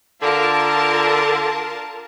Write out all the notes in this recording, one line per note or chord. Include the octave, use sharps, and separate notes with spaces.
D3 F4 A#4 A5